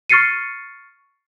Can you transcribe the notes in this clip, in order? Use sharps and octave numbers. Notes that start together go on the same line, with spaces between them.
C#6 F6 A6 C7 C#7 D#7